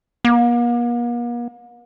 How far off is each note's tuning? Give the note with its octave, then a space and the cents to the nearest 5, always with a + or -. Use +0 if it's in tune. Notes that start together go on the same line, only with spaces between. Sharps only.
A#3 +45